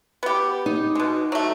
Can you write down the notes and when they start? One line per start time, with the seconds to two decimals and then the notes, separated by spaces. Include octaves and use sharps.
0.23 B3 G4
0.66 D#4
0.95 B2 G#3
1.32 F#3 A3